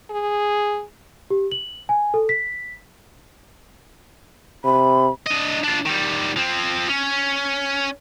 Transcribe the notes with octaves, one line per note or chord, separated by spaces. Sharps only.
G#4
G4
F#7
G#5
A4
B6
C3 B5
D4 D#5
D4 F4
D#3 G3
F3 C4
C#4